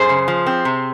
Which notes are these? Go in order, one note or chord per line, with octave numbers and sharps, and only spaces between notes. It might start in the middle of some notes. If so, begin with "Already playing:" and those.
Already playing: F#2 G#4 C5
C#3
F3
C4
C3